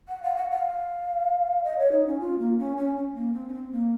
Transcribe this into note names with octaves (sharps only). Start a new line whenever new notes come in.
F#5
F5
F#5
F5
D#5
C#5
D#4
C#4
F4
A#3
C#4
C#4
C#4
A#3
C4
C#4
C4
A#3